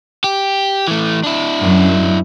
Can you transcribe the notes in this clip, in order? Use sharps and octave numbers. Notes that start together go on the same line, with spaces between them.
G4
E3 A3
D4 E4
F#2